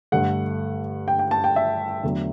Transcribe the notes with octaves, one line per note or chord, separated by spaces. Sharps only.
G2 D3 A3 F#5
G5
G5
A5
G5
E5
E2 D3 F#3 A3